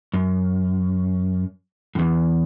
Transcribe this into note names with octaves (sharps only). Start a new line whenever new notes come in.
F#2
F#2
E2